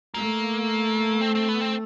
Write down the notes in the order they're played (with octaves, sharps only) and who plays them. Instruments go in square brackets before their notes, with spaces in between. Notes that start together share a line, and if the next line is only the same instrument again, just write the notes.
[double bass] A3 [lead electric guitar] A#3
[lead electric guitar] C4
C4
B3
C4